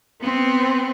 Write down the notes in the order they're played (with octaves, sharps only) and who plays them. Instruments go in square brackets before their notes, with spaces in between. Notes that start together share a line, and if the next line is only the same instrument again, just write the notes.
[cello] B3 C4